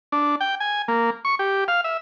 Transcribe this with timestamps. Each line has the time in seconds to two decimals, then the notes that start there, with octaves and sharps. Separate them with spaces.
0.12 D4
0.41 G5
0.60 G#5
0.88 A#3
1.25 C#6
1.39 G4
1.68 F5
1.84 E5